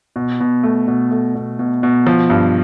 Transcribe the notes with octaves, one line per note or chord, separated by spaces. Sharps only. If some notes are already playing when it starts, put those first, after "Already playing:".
B2
B2
A3
B2
A3
B2
B2
B2
F3
G2